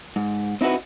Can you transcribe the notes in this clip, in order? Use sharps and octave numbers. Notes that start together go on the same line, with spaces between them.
G#2
C4 D#4 E4 F#4 B4